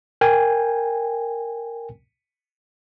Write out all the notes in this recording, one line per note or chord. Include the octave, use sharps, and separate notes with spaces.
A#4 G5 G#5